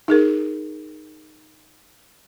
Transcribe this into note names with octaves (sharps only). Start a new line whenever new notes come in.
D#4 G#4 A#4